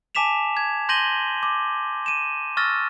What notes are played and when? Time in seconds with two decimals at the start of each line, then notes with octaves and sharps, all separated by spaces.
0.15 G#5 A5 D6 B6 E7 F7
0.57 G#6
0.89 C6 G6 A#6 D#7 F#7 G7
1.43 D6
2.06 D#7 E7
2.57 C#6 E6 F6 A6 A#6